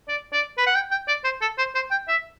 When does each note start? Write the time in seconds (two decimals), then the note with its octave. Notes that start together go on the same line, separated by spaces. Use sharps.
0.08 D5
0.33 D5
0.58 B4
0.67 F#5
0.75 G5
0.91 G5
1.08 D5
1.24 C5
1.41 A4
1.58 C5
1.75 C5
1.91 G5
2.08 E5